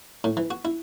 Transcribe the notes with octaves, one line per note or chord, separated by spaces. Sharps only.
A2
E3
F#4
E4